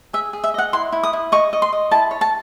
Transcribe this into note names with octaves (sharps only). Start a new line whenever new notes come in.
G#4 E5
G#4
E5
D#5 F#5
E4 C6
E4
D#6
E4
D#5 C#6
D#5
C6
D#5
E4 A5
C#5
A5